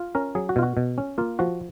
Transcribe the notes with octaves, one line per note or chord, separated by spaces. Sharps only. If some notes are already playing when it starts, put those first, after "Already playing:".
Already playing: F4
C#4 A#4
F#3 G#4
F#4
B2 F4
F#4
B2
C#4
A#3 F4
F3 F#4